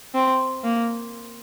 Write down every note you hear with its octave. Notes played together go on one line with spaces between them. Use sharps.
C4
A#3